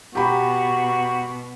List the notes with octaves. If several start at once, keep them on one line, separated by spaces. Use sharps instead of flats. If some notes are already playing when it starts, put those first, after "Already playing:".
B2 F#4 G4 A#5 B5